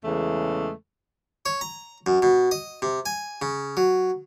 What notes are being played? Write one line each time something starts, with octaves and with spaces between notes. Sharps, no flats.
E2 C#3 E3 G#3 A3
C#5
A#5
F#2
B2
D#5
C3
G#5
C#3
F#3